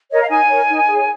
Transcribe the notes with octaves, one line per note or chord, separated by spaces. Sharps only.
A#4 C#5 D#5
F5
D#4 G#5
A#4 C#5
D#4
G#4 C#5